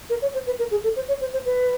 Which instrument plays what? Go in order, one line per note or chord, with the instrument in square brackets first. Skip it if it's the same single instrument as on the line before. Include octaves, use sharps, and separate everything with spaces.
[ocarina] A#4
C#5
C5
B4
A#4
G#4
A4
C5
C#5
C5
C5
B4